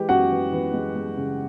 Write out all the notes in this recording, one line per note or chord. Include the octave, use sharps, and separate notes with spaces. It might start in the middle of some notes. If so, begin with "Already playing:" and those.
Already playing: E3 G#3 G4
F#2 F#4 F#5
E3
E3
G#3
G#3
C#3